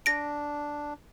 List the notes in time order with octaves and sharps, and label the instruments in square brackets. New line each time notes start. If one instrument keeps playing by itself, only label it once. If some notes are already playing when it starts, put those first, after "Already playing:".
[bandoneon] D4 [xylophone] A#6 D7